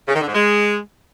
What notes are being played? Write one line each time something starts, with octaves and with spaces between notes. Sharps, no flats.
C#3
D#3
D3
G#2
G#3